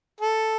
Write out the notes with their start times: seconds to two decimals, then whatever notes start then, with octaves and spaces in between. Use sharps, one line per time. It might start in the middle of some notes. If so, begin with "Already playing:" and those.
0.21 A4